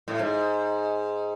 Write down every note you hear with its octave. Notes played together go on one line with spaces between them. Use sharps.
A2
G#2